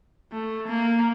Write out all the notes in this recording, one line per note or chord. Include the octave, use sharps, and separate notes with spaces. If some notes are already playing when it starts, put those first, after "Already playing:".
A3
A#3